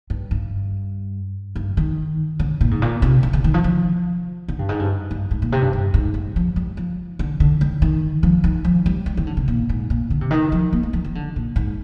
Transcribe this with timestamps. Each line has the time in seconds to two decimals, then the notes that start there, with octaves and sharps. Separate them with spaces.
0.10 G2
0.31 G2
1.56 G2
1.77 D#3
2.39 D3
2.61 A#2
2.71 G#2
2.82 A#2
3.02 C3
3.23 D3
3.33 D3
3.44 D#3
3.54 F3
3.64 F3
4.48 D3
4.59 G2
4.69 G#2
4.79 G2
5.11 G2
5.31 G#2
5.42 A#2
5.52 C3
5.62 G2
5.73 G2
5.94 G#2
6.14 G#2
6.36 F3
6.56 G3
6.77 F3
7.19 D3
7.40 D3
7.61 D#3
7.82 D#3
8.23 F3
8.44 D#3
8.65 F3
8.86 G3
9.06 G3
9.17 D#3
9.27 D3
9.37 C3
9.48 A#2
9.69 G#2
9.90 A#2
10.10 D3
10.21 C3
10.31 D#3
10.52 F3
10.73 A#3
10.83 G#3
10.93 F3
11.04 D#3
11.15 D3
11.36 A#2
11.56 G#2